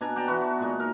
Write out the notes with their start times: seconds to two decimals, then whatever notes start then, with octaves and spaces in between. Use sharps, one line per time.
0.01 B2 D4 G#5 A#5
0.16 D5 G5 A5 A#5
0.28 E3 B3 F#4
0.41 F#4
0.60 A#2 G#3 D#4
0.80 A#4